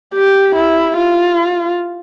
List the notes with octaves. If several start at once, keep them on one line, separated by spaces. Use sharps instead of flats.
G4
E4
F4